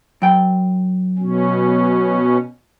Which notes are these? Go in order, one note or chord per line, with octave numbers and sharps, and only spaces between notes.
F#2 G5
B2 C#4